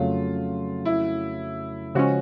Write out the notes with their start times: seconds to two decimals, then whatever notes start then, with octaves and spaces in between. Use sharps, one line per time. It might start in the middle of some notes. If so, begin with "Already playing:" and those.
Already playing: F2 C#3 F#3 A3 F4
0.85 E4
1.95 C#3 F3 G#3 C#4 F#4